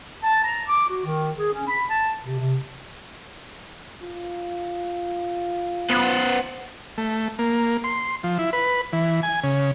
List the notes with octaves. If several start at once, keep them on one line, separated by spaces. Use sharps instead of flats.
A5
A#5
D6
F#4
D#3
G#4
C#4
B5
A5
C3
C3
F4
B3 B4 C5 F#5
A3
A#3
C6
F3
E4
B4
E3
G#5
C#3